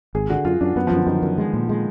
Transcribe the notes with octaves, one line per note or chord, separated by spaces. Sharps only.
G#1 G#4
D3 F#4
F#2 F4
F#2 D4
F#2 B3
F3
F#2
D3
F#2 D#3
F#2
G#3
A#2
G#3